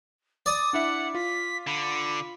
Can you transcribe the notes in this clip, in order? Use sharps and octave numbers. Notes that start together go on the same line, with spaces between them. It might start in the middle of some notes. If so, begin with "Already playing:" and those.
D5 D#6
D4 E4 E5 F#5
F4 B6
D3 B5